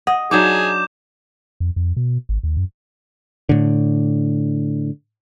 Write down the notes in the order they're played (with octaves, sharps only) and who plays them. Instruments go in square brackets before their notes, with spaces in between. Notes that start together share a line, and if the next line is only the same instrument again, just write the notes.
[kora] D#5 [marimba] F#5
[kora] F#3 D4 D#4 [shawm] G#4 [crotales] D6 G6 E7
[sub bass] F2
F2
B2
G#1
D#2
F#2
[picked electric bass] A2 D3